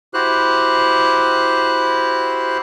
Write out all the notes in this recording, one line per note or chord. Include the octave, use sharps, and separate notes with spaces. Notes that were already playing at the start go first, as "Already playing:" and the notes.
E4 F#4 G4 C5 F#6